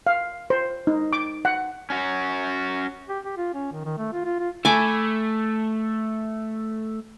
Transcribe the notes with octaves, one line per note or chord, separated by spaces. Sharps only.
F5
C5
D#4
D6
F#5
C#4 F#4
G4
G4
F4
C#4
D#3
D#3
A3
F4
F4
F4
A3 G#5 B5 D6